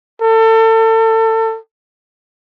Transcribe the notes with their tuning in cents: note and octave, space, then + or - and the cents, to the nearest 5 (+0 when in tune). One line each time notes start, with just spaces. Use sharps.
A4 +30